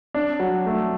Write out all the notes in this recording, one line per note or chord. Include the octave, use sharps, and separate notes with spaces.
D4
F#3
A3